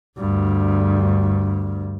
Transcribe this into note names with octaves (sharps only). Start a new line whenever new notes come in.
D2 G2